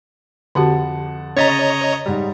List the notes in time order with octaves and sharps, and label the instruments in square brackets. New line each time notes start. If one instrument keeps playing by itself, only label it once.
[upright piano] F2 F#5 A5 [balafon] D3 F#4 G4
[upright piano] C#3 A6 B6 [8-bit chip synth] C#5 D#5 A#5
[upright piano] G#2 G3